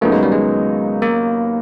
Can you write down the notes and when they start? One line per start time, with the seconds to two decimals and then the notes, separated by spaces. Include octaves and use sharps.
0.01 D#2 C#3 F#3 A3 B3 D#4
0.12 G#3
0.23 G3
0.32 G#3
1.02 A#3